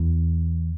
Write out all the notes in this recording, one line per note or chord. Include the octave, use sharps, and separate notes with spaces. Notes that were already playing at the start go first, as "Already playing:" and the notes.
Already playing: E2 E3